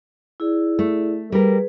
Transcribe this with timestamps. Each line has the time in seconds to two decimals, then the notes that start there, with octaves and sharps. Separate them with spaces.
0.40 E4 G#4 D5
0.79 A3
1.32 G3 G#4 A#4 B4